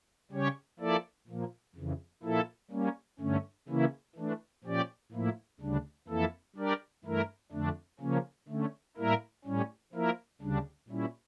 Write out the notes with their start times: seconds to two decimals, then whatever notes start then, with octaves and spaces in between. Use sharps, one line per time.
0.32 C#3 G3 C#4 G4 C#5
0.79 F3 A#3 E4 A4 D5
1.28 A#2 F3 A#3
1.75 F2 C#3 E3
2.23 A#2 F3 A#3 E4 A4
2.71 G3 A#3 C#4
3.19 G2 D3 A3 C#4
3.68 C#3 E3 A#3 C#4 E4
4.16 E3 A3 D4
4.64 A#2 F3 C#4 G4 D5
5.12 A2 F3 A#3 E4
5.60 D2 C#3 G3 D4
6.08 F2 E3 A#3 E4 A4
6.56 G3 D4 G4 A#4 D5
7.04 G2 E3 A3 E4 A#4
7.52 F2 D3 A3 D4
8.00 C#3 F3 A#3 C#4
8.48 D3 A3 C#4
8.97 A2 G3 A#3 E4 A#4
9.45 A2 G3 C#4
9.93 F3 A#3 E4 A#4
10.41 D2 C#3 G3 D4
10.88 A#2 G3 C#4 E4